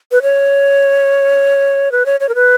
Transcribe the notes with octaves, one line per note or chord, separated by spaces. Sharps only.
B4
C#5
B4
C#5
C#5
A#4
B4